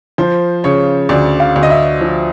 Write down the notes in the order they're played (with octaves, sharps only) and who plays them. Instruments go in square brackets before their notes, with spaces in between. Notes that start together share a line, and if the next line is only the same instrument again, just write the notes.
[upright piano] F3 [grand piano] C5
[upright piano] C#3 [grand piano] C#5
[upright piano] D2 [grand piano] D5
[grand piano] F5
[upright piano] D2
[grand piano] D#5
E5
[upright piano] F3